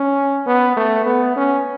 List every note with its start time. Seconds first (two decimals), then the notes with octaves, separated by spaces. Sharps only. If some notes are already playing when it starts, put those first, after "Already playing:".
Already playing: C#4
0.46 B3
0.77 A3
1.06 B3
1.36 C#4